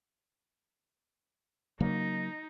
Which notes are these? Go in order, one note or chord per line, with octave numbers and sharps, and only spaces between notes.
C#3 F#3 A#3 D#4